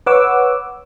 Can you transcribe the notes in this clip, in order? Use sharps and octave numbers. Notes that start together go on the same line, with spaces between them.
B4 C#5 F#5 D6 E6